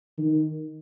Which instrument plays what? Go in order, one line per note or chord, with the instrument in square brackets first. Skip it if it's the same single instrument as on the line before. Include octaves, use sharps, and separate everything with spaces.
[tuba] D#3